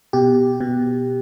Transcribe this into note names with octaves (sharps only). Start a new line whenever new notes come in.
B2 G4
B2